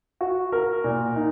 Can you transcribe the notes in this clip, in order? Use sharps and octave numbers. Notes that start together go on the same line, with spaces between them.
F#4
A#4
A#2
D#4